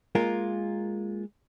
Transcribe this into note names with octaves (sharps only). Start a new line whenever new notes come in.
G#3 A#3 F4 A#4